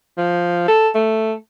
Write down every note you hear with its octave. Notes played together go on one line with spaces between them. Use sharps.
F3
A4
A3